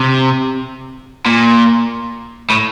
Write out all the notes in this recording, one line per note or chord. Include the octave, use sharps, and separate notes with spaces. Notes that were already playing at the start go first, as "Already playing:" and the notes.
Already playing: C3
A#2
A2